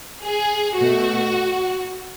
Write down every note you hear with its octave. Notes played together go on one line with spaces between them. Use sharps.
G#4
B2 A3 F#4